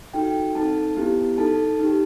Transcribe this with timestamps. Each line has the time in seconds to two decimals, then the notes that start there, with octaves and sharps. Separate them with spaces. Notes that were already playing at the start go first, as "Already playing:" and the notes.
0.14 D#4 F#4 A4 G5
0.55 C4 D#4 A4 A5
0.97 B3 E4 G4
1.38 D#4 A4 A5
1.80 D#4 G4